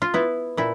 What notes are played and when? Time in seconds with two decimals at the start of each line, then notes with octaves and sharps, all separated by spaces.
0.02 F4
0.14 B3 E4
0.57 A#2 E4